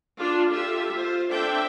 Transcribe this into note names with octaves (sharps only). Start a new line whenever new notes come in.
D4 F4
F4 G4 A4 E5
F4 C5
C4 D4 A4 E5 G5